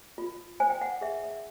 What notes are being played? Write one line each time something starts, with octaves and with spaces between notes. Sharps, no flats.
F4
C5 G#5
G5
F#5
G#4 E5
E5